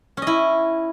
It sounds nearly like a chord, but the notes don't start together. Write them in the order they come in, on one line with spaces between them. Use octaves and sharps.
C#4 D#5 E4